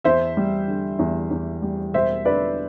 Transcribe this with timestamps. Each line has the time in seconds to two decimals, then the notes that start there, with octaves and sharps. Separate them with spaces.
0.04 E2 C5 E5
0.37 G3
0.68 D3
0.99 E2
1.31 E2
1.62 G3
1.94 E1 C5 E5
2.25 D3 B4 D5